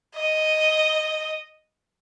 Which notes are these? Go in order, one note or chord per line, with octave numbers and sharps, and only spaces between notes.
D#5